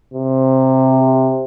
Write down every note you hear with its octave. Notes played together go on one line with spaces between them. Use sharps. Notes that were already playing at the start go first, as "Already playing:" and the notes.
C3